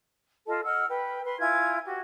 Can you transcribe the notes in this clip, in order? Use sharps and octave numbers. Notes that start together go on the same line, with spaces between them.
F4 A4 D#5 A5
D#5 F#5 E6 F6
B4 G5
B4 C6
E4 F4 G#5 G#6
F#4 G4